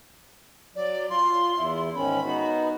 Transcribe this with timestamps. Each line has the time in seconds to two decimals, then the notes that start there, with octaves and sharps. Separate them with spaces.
0.76 F#3 D5
1.10 F4 C6
1.57 E2 E4
1.95 G#2 D#3 C#4 B5
2.25 B3 D#4 F#4